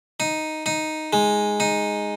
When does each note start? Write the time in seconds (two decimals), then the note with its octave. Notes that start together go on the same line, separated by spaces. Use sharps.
0.20 D#4
0.66 D#4
1.13 G#3
1.60 D#4